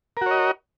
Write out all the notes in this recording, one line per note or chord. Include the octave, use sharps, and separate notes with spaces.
F#4 A#4 C#5 D#5